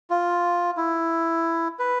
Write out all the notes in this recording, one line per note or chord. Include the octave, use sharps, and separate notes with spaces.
F4
E4
B4